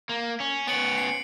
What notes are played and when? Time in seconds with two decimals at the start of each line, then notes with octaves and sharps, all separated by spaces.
0.09 A#3
0.40 C#4
0.67 B3 C#4 C#7 D7 F#7
0.98 C7